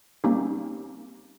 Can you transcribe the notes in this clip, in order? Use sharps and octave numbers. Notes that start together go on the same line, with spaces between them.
G3 A#3 C4 C#4 D#4 G4